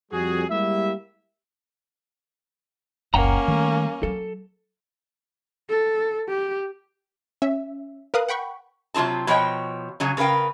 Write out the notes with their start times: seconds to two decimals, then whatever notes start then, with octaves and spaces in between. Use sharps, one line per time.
0.12 F2 G3 F#4 G#4
0.50 G3 G#3 A#3 E4 G4 E5
3.14 F#1 C#2 A#3 C#4 F#5 G5 A#5
3.48 D#3 G3 A3
4.03 F#3 A4
5.70 A4
6.29 G4
7.42 C#4 E5
8.14 A#4 B4 F5 D#6 F#6
8.29 F#5 G5 B5 C#6
8.94 C3 F#3 F4 G#4 A5
9.27 B2 F3 C#5 D#5 G5
10.00 C#3 F#3 C#4
10.17 C#3 A#4 B4 F5 G5